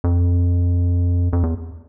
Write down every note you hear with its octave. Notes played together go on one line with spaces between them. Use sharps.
F2
F2
E2